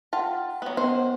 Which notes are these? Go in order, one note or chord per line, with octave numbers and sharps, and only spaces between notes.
F4 F#5 G5 A5
F#3 B3
D#3 B3 C5